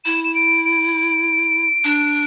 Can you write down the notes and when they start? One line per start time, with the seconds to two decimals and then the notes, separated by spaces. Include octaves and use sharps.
0.05 E4 E7
0.24 E7
0.35 D7
0.65 D7
1.84 D4